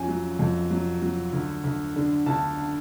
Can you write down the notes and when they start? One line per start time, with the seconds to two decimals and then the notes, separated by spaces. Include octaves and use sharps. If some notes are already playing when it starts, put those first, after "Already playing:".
Already playing: F2 C#4 G#5
0.08 F#3
0.39 F2
0.71 F#3
1.02 F#3
1.33 D2
1.64 D2
1.96 D3
2.26 D2 A5